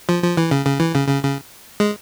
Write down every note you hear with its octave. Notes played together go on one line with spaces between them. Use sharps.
F3
F3
E3
C#3
C#3
E3
C#3
C#3
C#3
G#3